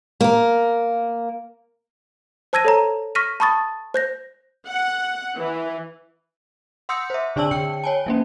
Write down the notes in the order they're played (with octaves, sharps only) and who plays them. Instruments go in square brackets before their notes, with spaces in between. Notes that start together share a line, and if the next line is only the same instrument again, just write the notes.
[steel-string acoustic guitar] A#3 A#4
[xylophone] C5 A5 E6 G#6 A#6 D#7
A4 C#5 A#5
C#6 F6 A#6 B6 D#7
A5 B5 C#6 D#6 A6
C5 G6 A#6
[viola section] F#5
E3
[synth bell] F#5 C6 D#6 E6 G6 C#7
C5 E5
D3 D4 D5 A5 E6 F#7
D3 G5 C#7
C#5 G#5 A5
F#3 A#3 C#4